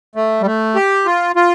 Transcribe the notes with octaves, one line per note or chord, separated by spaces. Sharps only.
A3
G3
A3
G4
F4
F4